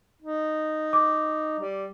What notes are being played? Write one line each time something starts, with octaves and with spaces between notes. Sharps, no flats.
D#4
D6
G3